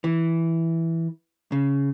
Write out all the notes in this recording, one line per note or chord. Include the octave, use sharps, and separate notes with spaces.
E3
C#3